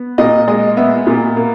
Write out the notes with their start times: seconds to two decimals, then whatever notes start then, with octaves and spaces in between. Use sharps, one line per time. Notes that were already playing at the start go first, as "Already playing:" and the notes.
Already playing: B3
0.18 A#2 D#5
0.48 G#3 D#5
0.77 B3 E5
1.07 A#2
1.36 A#3